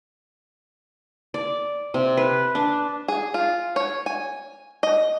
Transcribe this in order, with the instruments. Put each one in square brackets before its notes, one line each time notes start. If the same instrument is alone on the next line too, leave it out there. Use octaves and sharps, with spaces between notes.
[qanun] D5
C3
B4
D4
[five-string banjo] G#4
F4
C#5
G#5
D#5